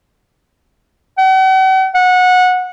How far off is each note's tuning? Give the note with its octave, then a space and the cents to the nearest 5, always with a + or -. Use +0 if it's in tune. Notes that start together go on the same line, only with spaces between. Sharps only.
F#5 +45
F#5 -20